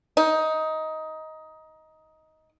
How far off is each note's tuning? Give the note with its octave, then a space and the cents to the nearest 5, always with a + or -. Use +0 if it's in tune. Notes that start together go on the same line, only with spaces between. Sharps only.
D#4 +15